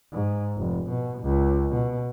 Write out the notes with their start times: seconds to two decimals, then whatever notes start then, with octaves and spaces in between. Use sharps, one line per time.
0.12 G#2
0.57 F1
0.89 B2
1.23 C#2
1.73 B2